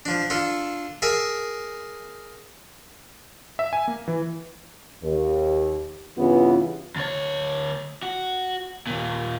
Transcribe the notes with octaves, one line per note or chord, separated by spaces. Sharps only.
F3 D4
D4 F4 A4
G#4 A#4 E5 A5
E5
G#5
A#3
E3
D#2
G2 C#3 E3 B3 F4
D2 C#5
F#4
D#2 A#2